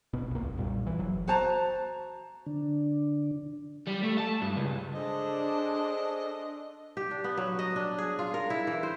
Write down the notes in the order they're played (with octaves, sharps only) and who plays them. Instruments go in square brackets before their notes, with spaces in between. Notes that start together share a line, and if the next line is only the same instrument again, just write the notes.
[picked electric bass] D1 G#1 B2 B3
C2 A#3
B1 F2
B1 A#2 G3
E3
F#1 F#3
[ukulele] F#4 C5 A5 A#5
[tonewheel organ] D3 D4
[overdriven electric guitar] G3
A3
A5
G2
C#2
[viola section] D4 [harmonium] G#4 A4 C5 [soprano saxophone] D#5
[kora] G4
D4
B3
F#3
D#5
D4
G#4
F4
A#4
E4
E3
C5